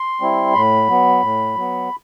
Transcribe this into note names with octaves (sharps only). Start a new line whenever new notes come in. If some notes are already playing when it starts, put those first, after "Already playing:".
Already playing: C6
G3 C4 E4
A2 B5
F#3 B3
A2
F#3 B3